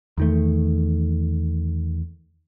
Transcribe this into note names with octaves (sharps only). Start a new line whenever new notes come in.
E2 D#3 A3